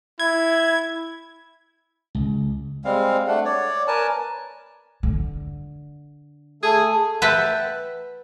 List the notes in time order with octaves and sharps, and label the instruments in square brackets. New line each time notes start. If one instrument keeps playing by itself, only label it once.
[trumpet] E4 [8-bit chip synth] G#6
[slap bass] C#2
[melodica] G3 G#3 C4 F5
A3 D4 F#5
C#5 D5
A#4 B4 G#5 A5
[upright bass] D3
[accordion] A3 A4 [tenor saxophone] G#4
[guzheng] B4 E5 F#5 G5 A5 B5